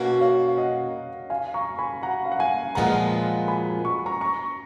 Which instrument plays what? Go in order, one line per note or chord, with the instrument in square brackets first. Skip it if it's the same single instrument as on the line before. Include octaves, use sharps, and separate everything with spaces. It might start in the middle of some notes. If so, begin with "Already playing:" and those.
Already playing: [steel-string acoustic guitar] B2 A#3 C#4 F#4 [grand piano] D#5
[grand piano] C#5 F5
D#5 F#5
F5 G#5
A#5 C#6
G#5 B5
F#5 A#5
F5
F#5
F5 G#5
[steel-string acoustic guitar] A#2 F3 G#3 B3 F4 [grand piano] F#5 A#5
[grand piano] G#5 B5
C#6
A#5 C#6
A#5 C#6